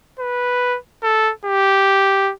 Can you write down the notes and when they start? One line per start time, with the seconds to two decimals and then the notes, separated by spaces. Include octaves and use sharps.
0.19 B4
1.03 A4
1.45 G4